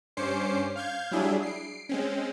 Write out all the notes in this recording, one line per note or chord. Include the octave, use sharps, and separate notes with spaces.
G2 C#4 C5 D6 C7 C#7
F5 F6 G6 G#6
F#3 G3 D4 E4 G#4
C7 D7
G#3 C4 C#4